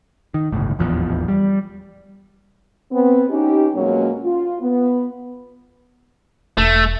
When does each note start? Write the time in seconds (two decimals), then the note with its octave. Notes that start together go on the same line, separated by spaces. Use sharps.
0.34 D#3
0.52 G1 C#2 A2
0.79 D#1 A1 E2 F3
1.28 G3
2.91 B3 C4
3.29 C#4 D#4 G4
3.74 F2 B2 F#3 G#3 A#3 C#4
4.24 F4
4.61 B3
6.58 E1 A3